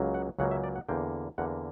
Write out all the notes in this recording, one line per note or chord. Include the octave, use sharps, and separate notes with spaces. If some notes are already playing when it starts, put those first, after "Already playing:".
Already playing: C#2 C#3 F#3 A#3
F#5
C#2 C#3 F#3 A#3 F#5
E5
D5
F#5
E2 D3 A#3 G5
E2 D3 A#3 F#5